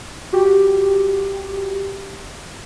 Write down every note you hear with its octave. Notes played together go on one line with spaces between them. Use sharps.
F#4 G4